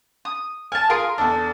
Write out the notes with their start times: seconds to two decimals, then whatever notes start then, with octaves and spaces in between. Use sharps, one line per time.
0.25 D#6
0.72 G#5 A5 F6
0.90 F4 G#4 A#4 C6 D7
1.18 E2 D4 A4